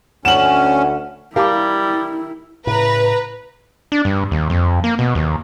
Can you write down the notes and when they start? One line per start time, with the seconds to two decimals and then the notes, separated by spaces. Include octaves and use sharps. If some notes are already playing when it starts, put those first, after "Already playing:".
0.25 D2 C#4 F#5 E7 F#7
1.36 G3 E4 G4 A#4 F5 A5 D6
2.67 A2 C#3 B4 A#5
3.92 D4
4.05 G2
4.31 D#2
4.50 F2
4.84 A#3
4.99 B2
5.15 D#2